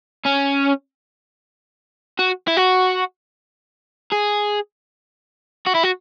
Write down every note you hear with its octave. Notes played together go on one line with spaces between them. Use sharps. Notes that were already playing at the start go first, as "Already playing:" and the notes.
C#4
F#4
E4
F#4
G#4
F#4
E4
F#4